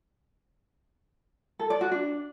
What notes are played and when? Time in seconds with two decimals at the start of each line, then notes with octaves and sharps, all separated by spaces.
1.59 A4
1.70 D5
1.81 F#4
1.92 D4